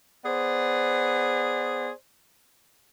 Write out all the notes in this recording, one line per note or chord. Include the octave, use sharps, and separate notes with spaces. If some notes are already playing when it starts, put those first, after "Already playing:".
B3 G#4 C5 D5